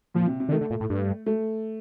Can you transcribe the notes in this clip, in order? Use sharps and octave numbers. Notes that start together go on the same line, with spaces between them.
A#2 F3
C3
C3
D3
D#3 A3
D3
A#2
A2
G2
A3